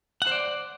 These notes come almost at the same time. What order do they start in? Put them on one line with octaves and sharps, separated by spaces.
F#5 C5 D5